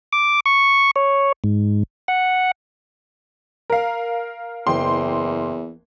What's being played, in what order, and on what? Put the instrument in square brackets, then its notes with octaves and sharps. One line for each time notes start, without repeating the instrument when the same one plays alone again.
[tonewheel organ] D6
C#6
C#5
G#2
F#5
[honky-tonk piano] A#4 F5
[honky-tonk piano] F#1 G5 C6 [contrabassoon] E2